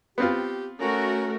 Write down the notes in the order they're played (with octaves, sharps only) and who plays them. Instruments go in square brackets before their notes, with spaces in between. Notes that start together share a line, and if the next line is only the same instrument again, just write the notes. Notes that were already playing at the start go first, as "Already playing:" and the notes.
[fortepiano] B3 C4 F4 [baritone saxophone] G4
[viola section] A3 F#4 A#4 [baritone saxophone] C#4